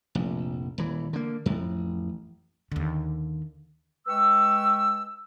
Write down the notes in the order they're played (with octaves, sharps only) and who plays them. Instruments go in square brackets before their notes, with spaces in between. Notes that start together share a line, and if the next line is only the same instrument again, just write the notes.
[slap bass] F1 A#1
D#1 E3
D3 A#3
A1 F2
[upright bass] D#2 D3
[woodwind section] G#3 B4 G5 C#6 E6